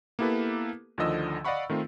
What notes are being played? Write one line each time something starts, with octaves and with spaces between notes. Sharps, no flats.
A#3 B3 E4 G4 A4 B4
D2 D3 D#3 F3 D#5 E6
D5 D#5 F5 F#5 B5 C#6
D#3 A3 C4 F4